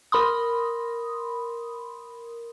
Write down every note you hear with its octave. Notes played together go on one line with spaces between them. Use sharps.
A#4 B5 C6 D#6